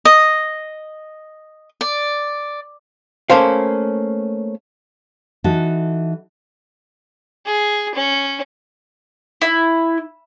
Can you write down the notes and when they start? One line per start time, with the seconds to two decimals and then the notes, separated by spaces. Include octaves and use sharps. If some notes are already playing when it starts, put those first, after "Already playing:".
0.05 D#5
1.81 D5
3.30 A3 A#3 C#4 C5 F5
5.44 E3 D#4 F#4 A4
7.46 G#4
7.94 C#4
9.41 E4